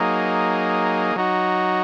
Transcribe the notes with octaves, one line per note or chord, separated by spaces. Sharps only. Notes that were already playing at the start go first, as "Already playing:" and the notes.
Already playing: F#3 A#3 D#4 G#4
F#3 D#4 F#4